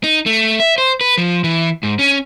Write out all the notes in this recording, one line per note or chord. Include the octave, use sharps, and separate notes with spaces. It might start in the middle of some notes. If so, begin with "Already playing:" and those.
D#4
A3
E5
C5
B4
F3
E3
G#2
C#4